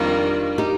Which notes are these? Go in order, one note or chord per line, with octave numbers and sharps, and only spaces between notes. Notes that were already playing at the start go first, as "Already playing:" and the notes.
Already playing: F2 D#3 G3 A#3 D4 F4
D#4 G4